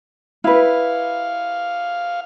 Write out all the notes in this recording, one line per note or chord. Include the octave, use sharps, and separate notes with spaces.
E4 B4 F5